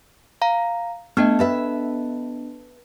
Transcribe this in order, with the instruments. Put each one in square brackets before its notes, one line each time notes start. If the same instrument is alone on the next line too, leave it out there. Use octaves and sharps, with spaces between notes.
[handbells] F5 A#5
[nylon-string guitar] A3 [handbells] B3 D4 D#5
[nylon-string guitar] A4 B4 E5